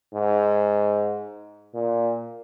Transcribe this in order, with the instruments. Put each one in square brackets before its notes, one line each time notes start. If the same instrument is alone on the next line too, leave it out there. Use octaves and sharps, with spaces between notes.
[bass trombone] G#2
A#2